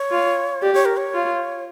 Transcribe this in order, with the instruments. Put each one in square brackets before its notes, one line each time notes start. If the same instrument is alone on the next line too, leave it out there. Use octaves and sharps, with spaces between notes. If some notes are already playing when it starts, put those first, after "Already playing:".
Already playing: [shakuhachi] C#5
[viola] F4
[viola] G4 [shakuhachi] D5
[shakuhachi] C#5
A#4
C#5
[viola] F4